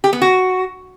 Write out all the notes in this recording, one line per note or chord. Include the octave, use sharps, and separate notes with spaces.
G4
B3
F#4